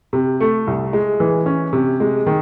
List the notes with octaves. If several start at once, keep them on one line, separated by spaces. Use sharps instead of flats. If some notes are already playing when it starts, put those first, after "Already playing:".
C3
A3
C2
G#3
E3
C#4
C3
G#3
D#3